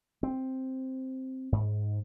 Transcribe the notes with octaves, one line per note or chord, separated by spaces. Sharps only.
C4
G#2